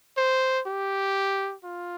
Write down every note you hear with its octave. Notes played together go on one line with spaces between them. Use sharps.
C5
G4
F4